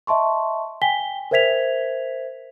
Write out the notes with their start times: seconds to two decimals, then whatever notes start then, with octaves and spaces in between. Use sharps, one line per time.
0.07 D#5 E5 A5 C6 C#6
0.82 G5 G#5 B6 G7
1.31 A#4 C5 E5 G#6 B6 F7